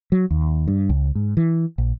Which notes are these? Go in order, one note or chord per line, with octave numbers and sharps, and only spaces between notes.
F#3
D#2
G2
C#2
G#2
E3
A#1